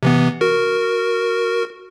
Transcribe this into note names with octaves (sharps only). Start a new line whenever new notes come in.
C3 E3 B3
F#4 A#4